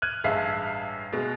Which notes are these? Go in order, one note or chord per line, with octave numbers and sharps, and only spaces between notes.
F6 F#6 G#6 D#7
A1 G2 G#3 E5 F5
B2 G#3